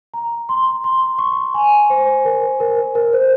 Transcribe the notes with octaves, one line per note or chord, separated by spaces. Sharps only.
A#5
C6
C6
C#6
G#5
C5
A#4
A#4
A#4
C5